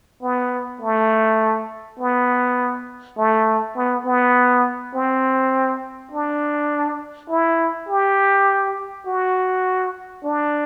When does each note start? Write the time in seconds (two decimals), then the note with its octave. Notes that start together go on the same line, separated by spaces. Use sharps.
0.23 B3
0.81 A3
1.99 B3
3.17 A3
3.76 B3
4.06 B3
4.94 C4
6.12 D4
7.30 E4
7.89 G4
9.06 F#4
10.25 D4